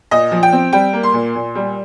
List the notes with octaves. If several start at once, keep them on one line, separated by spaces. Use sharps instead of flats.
A#2 D#5
F3
G5
C4
G3 G5
A#3
C6
A#2
A#2
G3